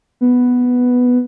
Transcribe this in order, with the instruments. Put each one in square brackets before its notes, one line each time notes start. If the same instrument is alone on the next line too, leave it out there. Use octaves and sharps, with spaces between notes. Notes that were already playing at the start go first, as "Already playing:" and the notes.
[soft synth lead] B3